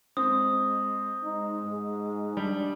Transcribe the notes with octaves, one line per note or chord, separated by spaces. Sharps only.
G#3 C4 D#6
G#3 D#4
G#2
G3 D4